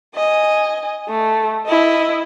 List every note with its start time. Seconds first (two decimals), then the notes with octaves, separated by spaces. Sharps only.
0.15 D#5 G#5
1.09 A3
1.67 E4 D#5